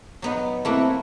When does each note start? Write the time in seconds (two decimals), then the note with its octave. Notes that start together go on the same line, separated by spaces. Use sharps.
0.22 F#3 B3 D#4
0.65 A3 A#3 C4 E4 F#4